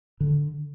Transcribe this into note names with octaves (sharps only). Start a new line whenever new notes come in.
D3